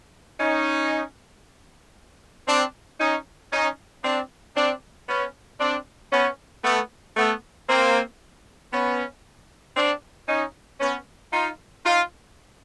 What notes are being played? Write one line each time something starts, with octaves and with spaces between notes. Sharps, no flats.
C#4 D#4
C4 D4
C#4 D#4
C#4 D#4
C4 D4
C4 D4
B3 C#4
C4 D4
B3 C#4
A3 B3
A3 B3
A#3 C4
B3 C#4
C4 D4
C#4 D#4
B3 C#4
D#4 F4
D#4 F4